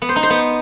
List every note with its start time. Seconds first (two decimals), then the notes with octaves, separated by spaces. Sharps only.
0.02 B3
0.09 C5
0.16 D#4
0.23 C5
0.30 B3